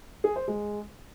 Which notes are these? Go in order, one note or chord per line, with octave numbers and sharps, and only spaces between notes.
G#4
C5
G#3